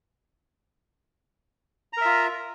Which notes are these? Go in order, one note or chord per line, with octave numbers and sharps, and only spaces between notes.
F4 A#4 E5 A#5